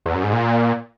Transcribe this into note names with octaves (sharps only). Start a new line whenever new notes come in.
E2
F#2
G#2
A#2